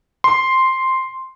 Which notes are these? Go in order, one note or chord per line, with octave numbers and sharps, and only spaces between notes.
C6